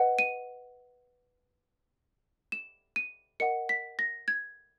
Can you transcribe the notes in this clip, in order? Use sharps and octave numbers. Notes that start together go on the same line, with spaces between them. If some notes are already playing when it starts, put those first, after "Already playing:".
Already playing: B4 D#5 F#5
D#7
E7
D#7
A#4 D#5 F#5 C#7
B6
A#6
G#6